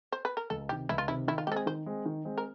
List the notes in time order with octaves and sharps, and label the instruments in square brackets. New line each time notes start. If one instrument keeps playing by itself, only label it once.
[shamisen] C5
B4
A#4
[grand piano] C#2 [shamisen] A4
[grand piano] C3 [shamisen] G4
[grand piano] D#3
[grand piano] C#2 [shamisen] E4
[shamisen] F4
[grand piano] C3 D#3 [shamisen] E4
[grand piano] D#3 [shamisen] E4
[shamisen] F4
[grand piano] G#3 C4 [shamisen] G4 A4
[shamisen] G#4
[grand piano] D#3 [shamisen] C5
[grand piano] G#3 C4
D#3
G#3 C4
[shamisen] A#4